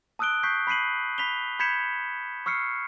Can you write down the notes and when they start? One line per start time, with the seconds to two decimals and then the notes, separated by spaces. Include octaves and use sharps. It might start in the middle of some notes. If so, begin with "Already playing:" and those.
0.19 A5 D#6 E6 F#6 D7 G7
0.43 C#6 G6 B6 C7
0.67 B5 B6 C7 D#7 F#7
1.18 B5 B6 F7 G7
1.59 B5 G6 G#6 B6 C#7 E7
2.46 C#6 E6 F6 C7 C#7